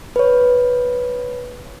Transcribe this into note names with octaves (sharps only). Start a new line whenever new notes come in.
B4 C#5